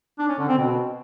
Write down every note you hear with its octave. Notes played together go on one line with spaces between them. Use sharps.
D4
C#4
D3
C4
B2